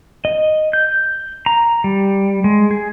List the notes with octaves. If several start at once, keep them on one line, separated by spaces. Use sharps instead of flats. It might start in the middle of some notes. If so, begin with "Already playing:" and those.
D#5
G6
A#5
G3
G#3
G#4